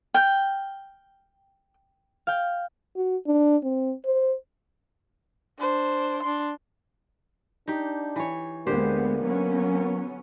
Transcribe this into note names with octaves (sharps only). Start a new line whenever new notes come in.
G5 F6 G6
F5 G5
F#4
D4
C4
C5
D4 C5
D4 C6
D4 D#4 G4
E3 C#5
D2 D3 G#3 A#3 B3 G4 C5
F#3 B3 C#4